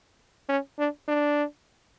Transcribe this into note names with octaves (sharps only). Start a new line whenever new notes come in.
C#4
D4
D4